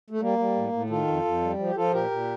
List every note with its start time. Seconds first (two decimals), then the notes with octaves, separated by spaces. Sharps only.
0.10 A3
0.20 G3 A#3
0.38 G3
0.55 A2
0.72 A2
0.90 D#3 F4 A4
1.07 F2
1.25 F2
1.42 G3
1.58 F3
1.67 G4
1.76 F3 F4 A4
1.93 A#2 G4 A#4
2.11 A#2